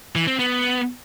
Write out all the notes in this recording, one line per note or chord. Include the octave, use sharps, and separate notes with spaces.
E3
C4
B3